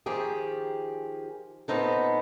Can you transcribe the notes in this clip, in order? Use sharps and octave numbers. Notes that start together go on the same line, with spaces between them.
D#3 F3 G4 G#4
A#2 G#3 B3 C4 D#4 A4